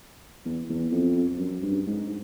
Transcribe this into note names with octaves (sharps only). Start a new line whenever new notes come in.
E2
E2
F2
F#2
G2
G#2